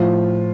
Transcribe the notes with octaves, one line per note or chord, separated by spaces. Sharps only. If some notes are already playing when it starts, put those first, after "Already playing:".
Already playing: A2 F3 F4